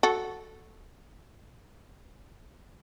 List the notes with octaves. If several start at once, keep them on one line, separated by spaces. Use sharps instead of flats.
F#4 A4